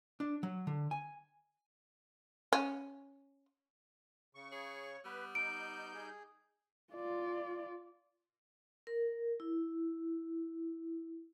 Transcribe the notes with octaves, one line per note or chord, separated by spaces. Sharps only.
D4
F#3
D3
G#5
C#4
C#3 C#6
G#4 C#5
G3 B3 B4
D#4 G6 D7
G#4
F4 D5
A#4
E4